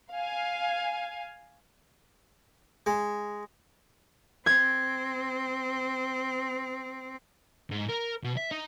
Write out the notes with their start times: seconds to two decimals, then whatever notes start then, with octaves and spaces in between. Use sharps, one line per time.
0.12 F5 G#5
2.86 G#3
4.46 C4 G#6
7.71 G#2
7.89 A#4
8.24 B2
8.37 E5
8.51 D#4